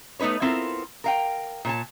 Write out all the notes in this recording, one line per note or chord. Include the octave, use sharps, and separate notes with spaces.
A3 B3 D#4 B4 C#5
B3 C4 E4 F4 A4 A#4
A#4 F5 G5
A#2 C#5 A5